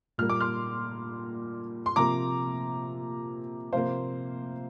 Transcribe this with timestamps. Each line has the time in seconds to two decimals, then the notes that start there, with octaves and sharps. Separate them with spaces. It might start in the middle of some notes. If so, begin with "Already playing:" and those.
0.18 A#2 G3 A#3 F6
0.30 D6
0.41 C6 F6
1.86 C6
1.96 C3 F3 A#3 A#5 D6
3.73 C3 F3 A#3 C5 F5